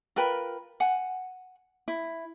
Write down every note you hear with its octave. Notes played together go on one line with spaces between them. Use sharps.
F4 A#4 B4 G5
F#5 G#5
E4